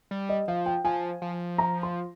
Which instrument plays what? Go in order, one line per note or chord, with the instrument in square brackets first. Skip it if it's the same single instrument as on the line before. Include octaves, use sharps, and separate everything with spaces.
[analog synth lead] G3
[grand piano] D#5
[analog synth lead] F3 [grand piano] F5
[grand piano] G5
[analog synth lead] F3 [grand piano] G#5
[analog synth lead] F3
[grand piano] A#5
C6